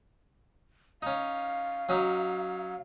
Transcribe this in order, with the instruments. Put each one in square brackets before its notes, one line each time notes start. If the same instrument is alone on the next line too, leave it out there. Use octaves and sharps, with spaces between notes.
[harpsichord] C#4 D#4 [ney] F5
[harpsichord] F#3 C#4 D#4